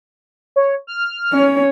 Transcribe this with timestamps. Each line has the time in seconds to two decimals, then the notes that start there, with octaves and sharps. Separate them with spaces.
0.56 C#5
0.87 F6
1.33 C#4 C#5